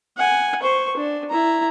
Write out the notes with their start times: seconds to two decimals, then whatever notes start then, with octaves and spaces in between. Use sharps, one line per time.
0.18 F#5 G#5
0.62 C5 C#6
0.97 D4
1.30 E4 A#5